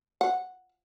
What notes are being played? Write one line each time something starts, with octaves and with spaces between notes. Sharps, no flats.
F#5